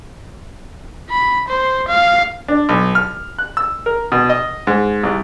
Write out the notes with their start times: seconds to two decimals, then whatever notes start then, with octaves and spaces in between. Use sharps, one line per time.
1.10 B5
1.48 C5
1.88 F5
2.48 D4
2.69 B1
2.95 F6
3.38 F#6
3.57 E6
3.86 A#4
4.12 B2
4.29 D#5
4.67 G#2
5.03 C2